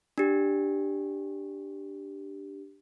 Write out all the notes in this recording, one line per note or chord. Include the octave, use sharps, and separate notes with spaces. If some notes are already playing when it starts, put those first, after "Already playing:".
D4 G4